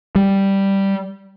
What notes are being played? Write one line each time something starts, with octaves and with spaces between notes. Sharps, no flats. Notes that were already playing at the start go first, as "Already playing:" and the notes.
G3